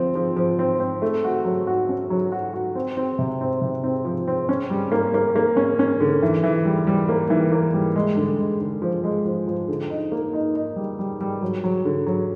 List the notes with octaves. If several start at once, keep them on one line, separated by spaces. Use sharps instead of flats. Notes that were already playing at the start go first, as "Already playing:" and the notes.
Already playing: F3 C4
F3
F3
C4
C4
A3
F#4
F#3
F#4
C#4
F#3
F#4
F#4
C4
C4
C3
C4
C3
C4
F3
C4
C#4
G3
A#3
A#3
A#3
C#4
C#4
D3
E3
E3
G3
G3
A#3
E3
A#3
G3
G#3
D3
G#3
D3
F3
G#3
F3
F3
D3
D#4
A#3
D#4
D#4
G3
G3
G3
F#3
F#3
D3
F#3